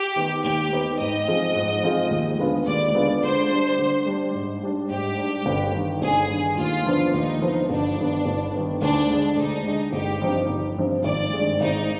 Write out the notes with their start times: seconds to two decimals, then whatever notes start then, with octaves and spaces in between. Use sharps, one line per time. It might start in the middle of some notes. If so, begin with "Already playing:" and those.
Already playing: G4
0.16 D#3 B3 D#4
0.44 D#2 G4
0.72 D#3 B3 D#4
1.00 G#2 D#5
1.27 F3 C4 F4 G#4
1.55 G#2
1.83 F3 C4 F4 G#4
2.11 D#2
2.39 D3 G#3 B3 F4
2.67 D#2 D5
2.95 D3 G#3 B3 F4
3.23 D3 C5
3.51 G3 D4
3.79 D3
4.06 G3 D4
4.34 G#2
4.63 G3 D4
4.90 G#2 G4
5.18 G3 D4
5.46 G1
5.75 G2 D#3
6.02 G1 G#4
6.30 G2 D#3
6.58 D#2 F4
6.86 D3 F3 B3 D4
7.14 D#2 D#4
7.42 D3 F3 B3 D4
7.69 G1 D4
7.98 G2 D#3 B3
8.26 G1
8.54 G2 D#3 B3
8.82 D2 D4
9.10 D3 G#3
9.37 D2 D#4
9.65 D3 G#3
9.93 G1 G4
10.22 G2 F3 C4 D#4
10.49 G1
10.77 G2 F3 C4 D#4
11.04 G#1 D5
11.33 G2 D#3 G#3
11.60 G#1 D#4